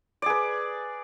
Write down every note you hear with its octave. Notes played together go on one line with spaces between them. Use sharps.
G#4 B4 D5